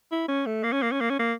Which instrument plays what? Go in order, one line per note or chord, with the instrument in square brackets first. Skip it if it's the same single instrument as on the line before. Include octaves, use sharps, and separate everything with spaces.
[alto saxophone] E4
C#4
A3
A#3
C#4
A#3
C#4
A#3
C#4
A#3